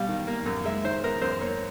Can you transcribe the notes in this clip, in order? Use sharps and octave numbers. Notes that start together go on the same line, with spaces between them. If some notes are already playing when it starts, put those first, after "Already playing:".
Already playing: B2 G3 F5
D#3
A#3
F#2
G#3 E5
D#3 C5
B3 A#4
F#2 C5
A#3 C#5